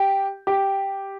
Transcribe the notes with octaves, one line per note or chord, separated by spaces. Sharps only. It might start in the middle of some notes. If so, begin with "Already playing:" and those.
Already playing: G4
G4